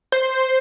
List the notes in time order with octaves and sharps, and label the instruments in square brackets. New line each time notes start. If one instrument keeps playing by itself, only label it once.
[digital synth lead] C5